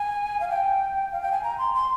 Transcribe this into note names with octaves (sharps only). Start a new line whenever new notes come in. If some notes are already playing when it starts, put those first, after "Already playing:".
Already playing: G#5
F5
G5
F5
G5
G#5
A#5
C6
C6